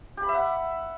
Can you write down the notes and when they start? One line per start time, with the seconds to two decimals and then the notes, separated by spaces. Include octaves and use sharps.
0.17 G4
0.23 B5
0.29 E5
0.34 F#5